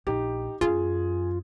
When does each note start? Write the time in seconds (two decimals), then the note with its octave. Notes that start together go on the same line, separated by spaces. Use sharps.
0.07 A#1 D#4 G4
0.61 F#2 F4 G#4